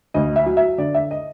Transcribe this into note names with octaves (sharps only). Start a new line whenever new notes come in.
D2 D#5
E5
F#3
E5
D3 D5
E5
D#5